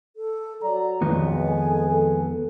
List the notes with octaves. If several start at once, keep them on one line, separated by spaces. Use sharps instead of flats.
A4
F#3 D5 A#5
B1 F2 D#3 G#3 B3
A4 G#5
A4